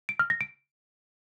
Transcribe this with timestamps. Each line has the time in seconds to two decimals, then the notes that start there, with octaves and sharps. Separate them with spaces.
0.09 D7
0.19 F6
0.30 A#6
0.41 D7